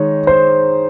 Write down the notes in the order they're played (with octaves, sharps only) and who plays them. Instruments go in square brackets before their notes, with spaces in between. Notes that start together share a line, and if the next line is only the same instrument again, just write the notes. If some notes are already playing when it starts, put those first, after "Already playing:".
Already playing: [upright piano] D#3 G#3 D#4 [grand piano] C#5
[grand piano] C5